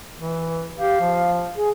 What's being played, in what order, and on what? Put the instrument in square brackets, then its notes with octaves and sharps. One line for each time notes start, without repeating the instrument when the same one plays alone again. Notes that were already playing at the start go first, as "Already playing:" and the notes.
[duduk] E3
[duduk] G4 [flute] F5
[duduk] F3
[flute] G#4